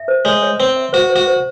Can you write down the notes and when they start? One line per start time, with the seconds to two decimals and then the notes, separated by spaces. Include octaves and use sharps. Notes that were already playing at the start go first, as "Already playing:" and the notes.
Already playing: E5
0.08 C5
0.25 G#3 C#5
0.42 C#5
0.60 C4 C#5
0.76 E5
0.93 F#4 C5
1.10 C5
1.16 F#4
1.27 C5